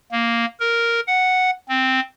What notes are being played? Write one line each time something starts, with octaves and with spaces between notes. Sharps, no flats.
A#3
A#4
F#5
C4